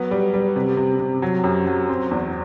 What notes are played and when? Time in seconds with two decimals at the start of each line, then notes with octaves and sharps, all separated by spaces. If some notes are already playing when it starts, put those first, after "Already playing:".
Already playing: F#3 B3
0.11 G3
0.34 G3
0.56 C3
0.77 C3
1.00 C3
1.22 F#3
1.44 F#2
1.67 F#3
1.89 C4
2.11 E2